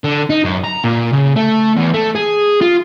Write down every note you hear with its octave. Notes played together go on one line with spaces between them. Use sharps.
D3
D#4
F#2
A#5
A#2
C#3
A3
E2
A3
G#4
F4